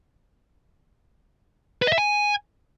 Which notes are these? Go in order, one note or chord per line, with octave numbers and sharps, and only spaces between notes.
B4
D#5
E5
G#5